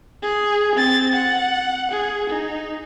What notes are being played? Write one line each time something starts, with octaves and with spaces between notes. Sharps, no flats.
G#4
C4 A6
F#5
G#4
D#4